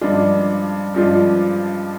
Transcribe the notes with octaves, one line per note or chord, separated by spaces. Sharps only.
G2 F3 G#3 D4 F4
G2 F3 G#3 D4 F4